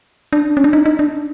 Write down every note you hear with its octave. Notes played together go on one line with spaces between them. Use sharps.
D4
C#4
D4
D#4
D#4
D4